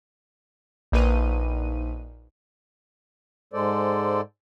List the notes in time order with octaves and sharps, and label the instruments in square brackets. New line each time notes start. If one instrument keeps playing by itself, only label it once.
[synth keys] A#1 A#3 D#4 B4 D#7
[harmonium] G#2 G#3 A4 C5 D5